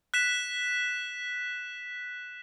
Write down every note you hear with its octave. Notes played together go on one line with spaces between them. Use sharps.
F#6 B6 E7